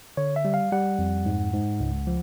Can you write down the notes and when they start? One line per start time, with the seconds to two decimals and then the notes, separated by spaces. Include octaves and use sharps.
0.17 D3 C#5
0.36 E5
0.45 G3
0.54 F5
0.72 G3 F#5
0.99 F2
1.26 G#2
1.53 G#2
1.80 C#2
2.07 F3